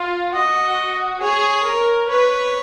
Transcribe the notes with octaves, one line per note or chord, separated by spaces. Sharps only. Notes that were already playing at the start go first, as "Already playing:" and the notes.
Already playing: F4
F#4 D#5
G#4 C#5
A#4
B4 C#5